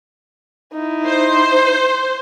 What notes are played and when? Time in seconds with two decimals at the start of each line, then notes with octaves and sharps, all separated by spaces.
0.73 D#4 E4
1.07 C5